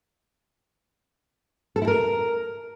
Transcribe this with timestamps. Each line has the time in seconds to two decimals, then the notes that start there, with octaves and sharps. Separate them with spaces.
1.76 A4
1.82 E4
1.88 A#4